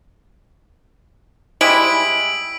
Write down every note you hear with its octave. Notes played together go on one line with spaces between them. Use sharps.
G3 G#3 E4 B6 D7 F#7